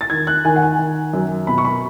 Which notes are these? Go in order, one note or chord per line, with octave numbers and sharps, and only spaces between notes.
A6
D#3 G#6
F#6
D#3 G#5
F#5
G#5
D#3
F#2
B2 B5
C#6
B5